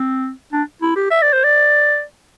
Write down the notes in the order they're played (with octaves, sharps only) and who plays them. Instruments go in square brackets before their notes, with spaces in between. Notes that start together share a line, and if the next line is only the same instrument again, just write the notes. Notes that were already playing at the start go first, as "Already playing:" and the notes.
Already playing: [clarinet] C4
D4
E4
G4
E5
D5
C5
D5